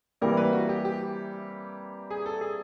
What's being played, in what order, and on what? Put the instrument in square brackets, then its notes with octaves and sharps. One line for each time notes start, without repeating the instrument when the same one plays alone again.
[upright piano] C3 E3 G3 A#3 [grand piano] A#4
[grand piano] B4
F#4
G4
G4
G#4
A4
G#4